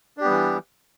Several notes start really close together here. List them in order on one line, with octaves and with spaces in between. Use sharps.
D4 G4 B3 G3 E3